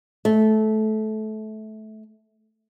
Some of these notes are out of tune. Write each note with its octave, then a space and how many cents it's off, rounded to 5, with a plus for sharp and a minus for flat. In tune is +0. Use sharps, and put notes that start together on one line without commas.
A3 -20